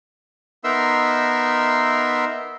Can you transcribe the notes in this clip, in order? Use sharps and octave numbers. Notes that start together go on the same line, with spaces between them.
B3 D#4 A#4 E5 C6 E6